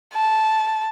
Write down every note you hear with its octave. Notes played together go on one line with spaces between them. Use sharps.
A5